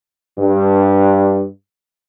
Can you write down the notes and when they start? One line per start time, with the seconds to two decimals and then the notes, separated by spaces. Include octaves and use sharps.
0.39 G2